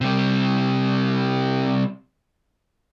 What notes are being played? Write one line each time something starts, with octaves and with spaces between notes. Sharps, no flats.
C3 G3